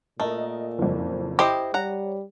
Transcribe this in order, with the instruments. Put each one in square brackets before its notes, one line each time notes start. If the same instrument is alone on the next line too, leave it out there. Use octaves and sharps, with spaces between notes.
[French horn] A#2 [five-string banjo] A3 [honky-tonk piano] A#4 D#5
[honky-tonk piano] F#1 F2
[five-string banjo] E4 C5 D#5 [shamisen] G4
[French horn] G3 [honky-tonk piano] C#5 [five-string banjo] F#5 A#5